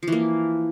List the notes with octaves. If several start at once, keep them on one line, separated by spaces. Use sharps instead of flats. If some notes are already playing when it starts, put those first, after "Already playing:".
E3 F3 A#3